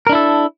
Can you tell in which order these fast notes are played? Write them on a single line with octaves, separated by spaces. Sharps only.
A#4 D4 E4 A4